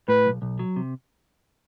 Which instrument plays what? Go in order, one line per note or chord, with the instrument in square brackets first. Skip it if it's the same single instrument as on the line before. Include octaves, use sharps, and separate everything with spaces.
[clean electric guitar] A2 [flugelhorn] B4
[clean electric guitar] B1
B1
F#3
C3